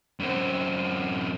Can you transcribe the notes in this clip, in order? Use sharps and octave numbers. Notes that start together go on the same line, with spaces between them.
F#2 C4